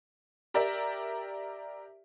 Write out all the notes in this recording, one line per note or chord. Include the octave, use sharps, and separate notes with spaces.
G4 A#4 D5 E5